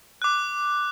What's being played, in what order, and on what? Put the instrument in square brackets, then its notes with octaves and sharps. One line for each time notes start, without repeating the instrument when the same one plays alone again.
[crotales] D6 F#6